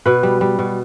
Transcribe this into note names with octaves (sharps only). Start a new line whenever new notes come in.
B2 B4
G3
G3
B2